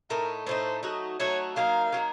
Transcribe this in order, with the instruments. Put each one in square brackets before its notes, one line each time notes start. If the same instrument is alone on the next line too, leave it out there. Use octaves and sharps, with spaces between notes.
[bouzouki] A2 A3 D#4 [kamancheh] A#4
[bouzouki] A2 A3 D#4 [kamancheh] C5
[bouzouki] F#3 A3 D#4 F#4
[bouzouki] F#3 A3 D#4 F#4 [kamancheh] C#5
[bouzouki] F#3 A#3 D#4 A#4 [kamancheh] F5
[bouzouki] F#3 A#3 D#4 A#4